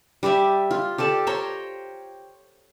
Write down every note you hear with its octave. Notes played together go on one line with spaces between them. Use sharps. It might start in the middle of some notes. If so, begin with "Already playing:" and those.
G3 G4 D5 E5
F4
G4 A4 D5 A5
C5 C#5 G5 A#5